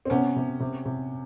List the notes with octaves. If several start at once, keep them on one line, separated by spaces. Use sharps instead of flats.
C4
C3 B3 C#4
C3
C3
C3